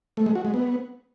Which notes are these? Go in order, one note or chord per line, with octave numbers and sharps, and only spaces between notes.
A3
G#3
F#4
G#3
B3